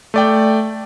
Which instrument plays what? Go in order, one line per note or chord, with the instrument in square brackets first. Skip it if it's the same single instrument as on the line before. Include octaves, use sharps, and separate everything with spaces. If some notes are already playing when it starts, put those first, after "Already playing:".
[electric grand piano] A3 D5 G5